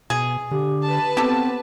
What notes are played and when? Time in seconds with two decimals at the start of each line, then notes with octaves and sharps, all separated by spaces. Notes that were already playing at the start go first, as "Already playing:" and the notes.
0.10 B2 G#4
0.51 D3 G4
0.82 B4 A5
1.17 B3 C4 G4 A4